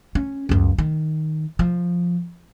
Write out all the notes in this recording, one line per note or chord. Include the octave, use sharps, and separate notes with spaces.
C#4
C#2 F#2
D#3
F3